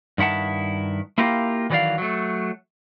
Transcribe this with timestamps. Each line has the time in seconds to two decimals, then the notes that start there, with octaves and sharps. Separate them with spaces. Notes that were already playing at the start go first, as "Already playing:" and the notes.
0.18 G2 D#3 E4 F#5 A5
1.18 A#3 E4 F4 G4 A#4
1.70 D#3 E3 F#3 C5 D5 F5
1.98 F#3 A3